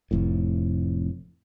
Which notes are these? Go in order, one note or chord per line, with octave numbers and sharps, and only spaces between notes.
F1 F2 A2